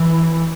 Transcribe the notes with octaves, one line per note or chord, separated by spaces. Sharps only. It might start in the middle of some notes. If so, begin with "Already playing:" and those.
Already playing: E3